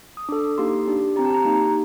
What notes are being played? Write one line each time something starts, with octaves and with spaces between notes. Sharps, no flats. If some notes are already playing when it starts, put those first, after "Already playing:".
D#6
D4 A4 D6
A#3 D#4 G4 C6
D4 G4
C4 G4 A#5
A5
A#5
A#3 D#4 G4